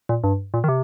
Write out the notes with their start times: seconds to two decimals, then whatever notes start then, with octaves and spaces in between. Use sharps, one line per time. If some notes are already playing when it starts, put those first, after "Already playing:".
0.09 A#2
0.24 G2
0.54 A#2
0.64 D#3
0.69 C3